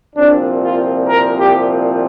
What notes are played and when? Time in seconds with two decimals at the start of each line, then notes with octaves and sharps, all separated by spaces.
0.15 C2 A#2 F3 C4 D4
0.61 F4
1.07 A#4
1.37 G4